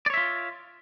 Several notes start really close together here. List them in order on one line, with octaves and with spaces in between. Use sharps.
D5 C#5 E5 F4